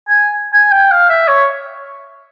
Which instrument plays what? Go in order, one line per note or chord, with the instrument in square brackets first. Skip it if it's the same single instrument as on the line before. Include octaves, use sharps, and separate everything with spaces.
[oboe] G#5
G#5
G5
F5
E5
C#5